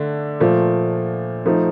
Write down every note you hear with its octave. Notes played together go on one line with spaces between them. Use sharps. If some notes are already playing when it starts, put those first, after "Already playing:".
Already playing: D3 A3 D4
A#2 F3 A3
F3 A3 D#4